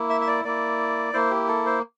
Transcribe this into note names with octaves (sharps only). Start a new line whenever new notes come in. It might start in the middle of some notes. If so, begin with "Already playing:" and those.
Already playing: A#3 E4
E5
E5
D5
A#3 E4 D5
A#3 E4 C5
G4
A4
C5